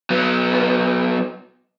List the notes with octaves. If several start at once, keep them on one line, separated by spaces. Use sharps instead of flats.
F#3 B3